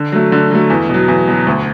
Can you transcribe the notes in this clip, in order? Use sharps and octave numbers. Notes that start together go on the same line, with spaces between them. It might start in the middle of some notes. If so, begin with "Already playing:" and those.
Already playing: D3
F#3 A3
D3
F#3 A3
E2
B2 F#3
E2
B2 F#3
D2